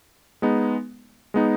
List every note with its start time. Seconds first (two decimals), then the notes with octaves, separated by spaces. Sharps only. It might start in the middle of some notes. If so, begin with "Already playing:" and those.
0.42 G#3 B3 D#4
1.34 G#3 B3 D#4